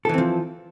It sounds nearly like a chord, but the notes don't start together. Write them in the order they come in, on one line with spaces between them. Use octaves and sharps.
A4 E3 C4 F3